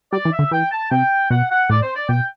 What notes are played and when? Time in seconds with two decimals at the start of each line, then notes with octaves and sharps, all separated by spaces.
0.13 G3 D5
0.25 E3
0.33 E5
0.39 D3
0.51 E3 G5
0.72 A5
0.91 C3 G5
1.30 B2 F#5
1.50 F#5
1.70 A2 D5
1.83 C5
1.95 D5
2.09 B2 G5